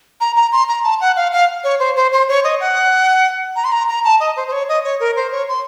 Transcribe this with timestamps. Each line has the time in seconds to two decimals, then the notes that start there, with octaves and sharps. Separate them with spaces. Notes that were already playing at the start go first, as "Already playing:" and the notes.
0.21 A#5
0.36 A#5
0.52 C6
0.69 A#5
0.84 A5
1.01 F#5
1.17 F5
1.33 F5
1.64 C#5
1.80 C5
1.96 C5
2.12 C5
2.29 C#5
2.44 D#5
2.60 F#5
3.56 A#5
3.64 C6
3.72 A#5
3.88 A#5
4.05 A5
4.20 D#5
4.37 C5
4.48 C5
4.52 C#5
4.69 D#5
4.84 C#5
5.00 A#4
5.16 C5
5.32 C#5
5.48 C6